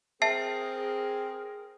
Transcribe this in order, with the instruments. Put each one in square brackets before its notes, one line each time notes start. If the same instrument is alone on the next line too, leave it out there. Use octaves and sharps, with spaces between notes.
[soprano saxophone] C4 [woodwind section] G#4 A#4 [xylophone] E5 A5 C7